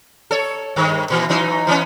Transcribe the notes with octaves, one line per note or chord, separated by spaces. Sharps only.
A4 C#5
G2 D#3
A#2 E3
E3 F#3 D#4
E3 B3 C#4